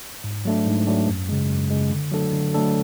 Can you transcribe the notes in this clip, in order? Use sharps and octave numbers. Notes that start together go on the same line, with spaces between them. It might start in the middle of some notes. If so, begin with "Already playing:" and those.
G#2
F#3 A3 D4
G#2
F#3 A3 D4
F#2
C#3 G#3
F#2
C#3 G#3
D3
F#3 A3 D4 A4
D3
F#3 A3 D4 A4